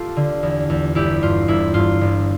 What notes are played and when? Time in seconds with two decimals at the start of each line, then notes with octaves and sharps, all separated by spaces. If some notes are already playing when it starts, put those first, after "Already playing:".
Already playing: F4 G4 A4
0.16 D3
0.43 E2
0.70 E2
0.95 G1 E4 G4
1.22 G2 F4
1.48 G1 E4
1.74 G2 F4
2.01 G1